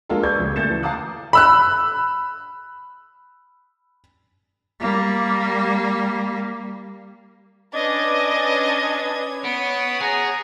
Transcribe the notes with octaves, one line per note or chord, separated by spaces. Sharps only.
G#3 A#3 D4 F4 A4 A#4
A4 B4 D5 C#6 G6 G#6
C#2 C#3
D2 A3 G6 A6 C#7 E7
E3
F5 A5 A#5 D6 D#6 F#6
B5 E6 F#6
G3 A#3
C#4 D4 B4 D#5 G#6
B3 C#5 D#6 D7
G#4 F#5 A#5